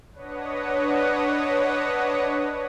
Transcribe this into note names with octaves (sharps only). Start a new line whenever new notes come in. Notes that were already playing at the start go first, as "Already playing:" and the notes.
D4 B4 C#5 D#5 F#5